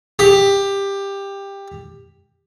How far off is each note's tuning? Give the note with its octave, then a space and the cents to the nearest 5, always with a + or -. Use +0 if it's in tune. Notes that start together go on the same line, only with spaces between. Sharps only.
G4 +15